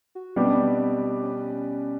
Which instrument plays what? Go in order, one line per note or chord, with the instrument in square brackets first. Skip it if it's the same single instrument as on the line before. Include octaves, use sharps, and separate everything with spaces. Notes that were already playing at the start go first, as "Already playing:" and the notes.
[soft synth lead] F#4
[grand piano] B2 G3 B3 D4 G4 [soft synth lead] C4
[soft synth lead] C#4
C4
C#4